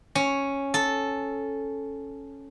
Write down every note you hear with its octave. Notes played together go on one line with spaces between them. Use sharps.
C#4
A4